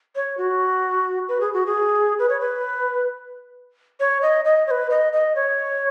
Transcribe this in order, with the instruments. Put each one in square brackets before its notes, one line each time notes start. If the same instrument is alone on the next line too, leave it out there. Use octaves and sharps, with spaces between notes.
[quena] C#5
F#4
B4
G#4
F#4
G#4
B4
C#5
B4
C#5
D#5
D#5
C#5
B4
D#5
D#5
C#5